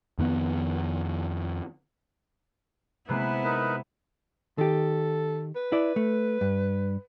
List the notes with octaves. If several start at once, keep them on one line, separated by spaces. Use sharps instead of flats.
F2 D#3 B3
C3 G#3 A#3 B3 E4 B4
D#4 A#4 B4
D#3 G4 A4
B4
E4 D5
A3
G2